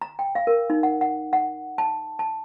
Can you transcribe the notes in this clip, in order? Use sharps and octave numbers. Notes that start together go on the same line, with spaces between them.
A#5
G5
F5
A#4
D#4
F#5
F#5
F#5
A5
A5